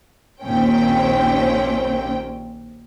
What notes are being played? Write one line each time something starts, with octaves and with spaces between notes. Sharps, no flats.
A#1 D#2 A#2 C4 C#4 G5